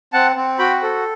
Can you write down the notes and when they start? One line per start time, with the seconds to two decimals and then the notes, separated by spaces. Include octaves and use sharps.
0.13 C4 F#5 A5
0.36 C4
0.59 F#4 G5 B5
0.83 A4